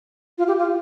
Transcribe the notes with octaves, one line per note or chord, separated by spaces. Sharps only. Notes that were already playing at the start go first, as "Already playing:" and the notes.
F4
G4
F4